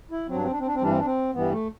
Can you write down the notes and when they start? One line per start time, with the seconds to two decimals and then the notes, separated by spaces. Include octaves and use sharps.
0.11 E4
0.28 F#3 C4
0.32 G2 D4
0.44 C4
0.51 D4
0.59 C4
0.67 D4
0.75 C4
0.81 G2 E3 G3 D4
0.90 C4
0.98 D4
1.05 C4
1.34 G2 E3 G3 B3
1.52 A3